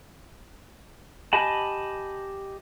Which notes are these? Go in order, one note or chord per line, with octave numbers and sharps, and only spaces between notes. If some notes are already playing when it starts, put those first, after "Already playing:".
G4 D#5 G#5 A5 B5